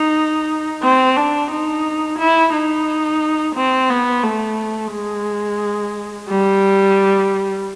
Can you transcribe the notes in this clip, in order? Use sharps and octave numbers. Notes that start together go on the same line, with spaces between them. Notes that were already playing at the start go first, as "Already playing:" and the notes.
Already playing: D#4
C4
D4
D#4
E4
D#4
C4
B3
A3
G#3
G3